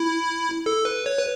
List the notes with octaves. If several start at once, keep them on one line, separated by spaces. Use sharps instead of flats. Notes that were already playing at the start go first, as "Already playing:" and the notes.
Already playing: E4
A4
B4
C#5
B4